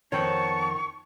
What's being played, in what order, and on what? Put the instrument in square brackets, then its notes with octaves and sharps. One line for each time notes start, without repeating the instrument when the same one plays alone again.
[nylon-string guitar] F2 D#3 [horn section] B3 A5 [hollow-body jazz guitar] C#5 G5 [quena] C#6